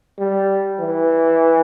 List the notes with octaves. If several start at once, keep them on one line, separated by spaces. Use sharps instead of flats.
G3
E3